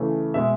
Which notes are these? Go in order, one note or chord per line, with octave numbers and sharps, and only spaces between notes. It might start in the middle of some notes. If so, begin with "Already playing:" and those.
Already playing: C#3 E3 A3
B2 G#3 E5